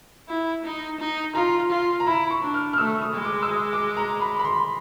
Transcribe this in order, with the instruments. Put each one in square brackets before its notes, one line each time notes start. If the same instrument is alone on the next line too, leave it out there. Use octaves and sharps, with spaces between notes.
[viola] E4
D#4
D#4
[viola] F4 [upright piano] A#5
[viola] F4
[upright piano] A#5
[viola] E4 [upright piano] B5
[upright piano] C#6
[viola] D4
[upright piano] F6
F6
[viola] A3 [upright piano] E6
[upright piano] D#6
[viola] G#3
[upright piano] D6
E6
D#6
D6
A#5
B5
B5
C6